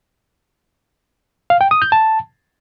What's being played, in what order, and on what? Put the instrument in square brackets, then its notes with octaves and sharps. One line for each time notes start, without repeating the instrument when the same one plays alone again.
[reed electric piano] F5
G5
D#6
G6
A5